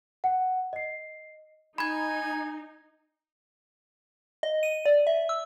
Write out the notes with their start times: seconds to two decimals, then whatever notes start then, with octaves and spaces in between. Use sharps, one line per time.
0.24 F#5
0.73 D#5 C7
1.78 D#4 G#5 B5 G#6
4.43 D#5
4.63 D#7
4.86 D5
5.07 E5
5.29 E6